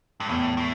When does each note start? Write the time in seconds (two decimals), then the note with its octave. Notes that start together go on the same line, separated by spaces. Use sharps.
0.20 G2
0.29 E2 A2
0.57 A2